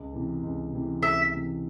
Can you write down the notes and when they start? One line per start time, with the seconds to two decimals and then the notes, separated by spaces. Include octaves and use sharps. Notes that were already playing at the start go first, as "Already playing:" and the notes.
Already playing: C#2
0.13 C3 E3
0.43 C#2
0.73 C3 E3
1.02 C#2 E5
1.32 C3 E3